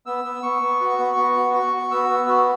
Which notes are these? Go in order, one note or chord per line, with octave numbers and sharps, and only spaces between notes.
B3 E6
B3
B3 C#6
B3
F#4
B3
B3
F#4
F#4 C#6
F#4
B3 E6
B3
F#4